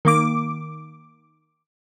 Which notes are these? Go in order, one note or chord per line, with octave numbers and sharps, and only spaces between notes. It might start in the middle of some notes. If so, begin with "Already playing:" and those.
D#3 A#3 D6